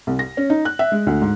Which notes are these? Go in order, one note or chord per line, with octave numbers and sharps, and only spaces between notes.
C2
A#6
C#4
D#4
F#6
E5
G#3
D2
G#2